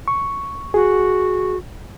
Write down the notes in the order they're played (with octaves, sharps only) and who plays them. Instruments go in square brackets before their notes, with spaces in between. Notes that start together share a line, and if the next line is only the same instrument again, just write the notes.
[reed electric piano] C#6
[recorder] F#4 [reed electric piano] G#4